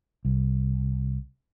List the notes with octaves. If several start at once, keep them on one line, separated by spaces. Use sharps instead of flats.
C2